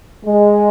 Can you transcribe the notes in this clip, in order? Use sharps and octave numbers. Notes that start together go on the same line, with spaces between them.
G#3